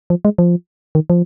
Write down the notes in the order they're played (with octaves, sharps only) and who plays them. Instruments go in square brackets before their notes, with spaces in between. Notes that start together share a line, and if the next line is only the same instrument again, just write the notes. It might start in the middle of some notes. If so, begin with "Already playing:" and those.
[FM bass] F3
G#3
F3
D#3
F3